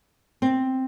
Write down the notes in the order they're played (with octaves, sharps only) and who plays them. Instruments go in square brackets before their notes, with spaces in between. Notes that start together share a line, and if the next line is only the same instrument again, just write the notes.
[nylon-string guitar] C4